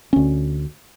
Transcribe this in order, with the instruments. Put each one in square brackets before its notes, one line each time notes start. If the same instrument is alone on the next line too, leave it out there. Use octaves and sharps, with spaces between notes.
[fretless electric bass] D2 C#4